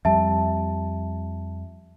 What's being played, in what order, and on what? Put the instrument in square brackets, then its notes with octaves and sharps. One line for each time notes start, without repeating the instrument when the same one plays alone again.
[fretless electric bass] F2 G3 [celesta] E5 A5